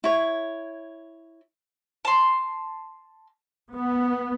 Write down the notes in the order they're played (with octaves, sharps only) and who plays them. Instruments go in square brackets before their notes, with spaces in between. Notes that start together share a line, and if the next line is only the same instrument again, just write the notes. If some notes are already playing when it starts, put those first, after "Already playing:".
[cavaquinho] E4 C#5
[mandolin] A5 C6
[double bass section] B3